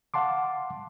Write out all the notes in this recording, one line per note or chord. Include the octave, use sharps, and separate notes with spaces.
F5 F#5 A5 C6 D6